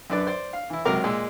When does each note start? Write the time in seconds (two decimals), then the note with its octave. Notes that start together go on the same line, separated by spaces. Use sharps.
0.10 F#2 D4 B4 D5
0.27 C5 D5
0.53 F5
0.70 E3 E4
0.85 C#2 C3 F#3 A#4 A#5 D6
1.04 A#2 G#3 E6